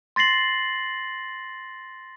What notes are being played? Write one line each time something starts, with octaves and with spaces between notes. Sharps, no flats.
C6 A6 A#6 C7 F#7